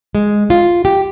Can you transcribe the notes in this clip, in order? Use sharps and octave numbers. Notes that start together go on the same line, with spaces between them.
G#3
F4
G4